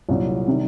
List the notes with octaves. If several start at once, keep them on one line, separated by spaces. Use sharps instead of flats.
C2 A#2 F#3
C3 D#3 G3